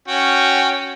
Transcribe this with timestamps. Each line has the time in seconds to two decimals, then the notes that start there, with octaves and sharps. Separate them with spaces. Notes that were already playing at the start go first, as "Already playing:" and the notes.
0.08 C#4 F#4 G5